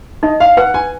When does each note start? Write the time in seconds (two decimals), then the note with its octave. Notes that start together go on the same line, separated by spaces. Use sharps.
0.23 D#4 D#5
0.40 F5
0.57 B4 F#5
0.74 G#5